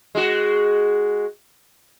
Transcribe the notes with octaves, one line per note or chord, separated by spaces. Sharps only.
G#3 F#4